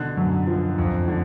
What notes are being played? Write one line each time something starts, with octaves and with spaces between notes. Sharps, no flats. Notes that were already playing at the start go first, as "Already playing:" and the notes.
Already playing: B2 D3 F#6
F#2
F3
F2
D3